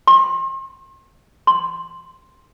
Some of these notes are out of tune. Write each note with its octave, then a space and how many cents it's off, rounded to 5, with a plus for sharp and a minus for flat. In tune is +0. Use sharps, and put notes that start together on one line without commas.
C6 +40
C6 +5